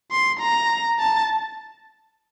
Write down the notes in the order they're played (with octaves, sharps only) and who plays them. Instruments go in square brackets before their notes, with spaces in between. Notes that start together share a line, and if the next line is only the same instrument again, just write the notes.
[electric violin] C6
A#5
A5